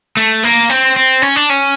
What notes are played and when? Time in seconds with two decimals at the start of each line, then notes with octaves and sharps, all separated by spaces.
0.17 A3
0.44 A#3
0.70 C4
0.96 C4
1.22 C#4
1.36 D4
1.50 C#4